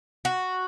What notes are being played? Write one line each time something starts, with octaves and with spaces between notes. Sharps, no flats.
F#4